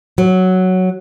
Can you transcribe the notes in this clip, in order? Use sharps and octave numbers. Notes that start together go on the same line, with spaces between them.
F#3